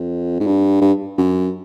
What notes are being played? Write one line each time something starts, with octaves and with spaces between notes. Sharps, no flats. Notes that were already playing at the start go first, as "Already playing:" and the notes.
Already playing: F2
G#2
G2
G2
F#2